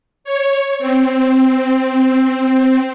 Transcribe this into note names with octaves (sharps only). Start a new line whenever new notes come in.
C#5
C4